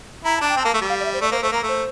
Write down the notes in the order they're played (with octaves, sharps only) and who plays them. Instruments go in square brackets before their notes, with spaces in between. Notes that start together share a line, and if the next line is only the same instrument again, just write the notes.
[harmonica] E4 [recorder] A#5
[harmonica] D4 [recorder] A5
[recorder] G5
[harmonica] C4
[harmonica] A#3 [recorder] A5
[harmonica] A3
G3
[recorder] F5
D5
E5
C5
[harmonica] A3 [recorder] D5
[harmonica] A#3 [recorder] C5
[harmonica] A3 [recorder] C5
[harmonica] A#3 [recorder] A#5
[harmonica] A3
[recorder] C5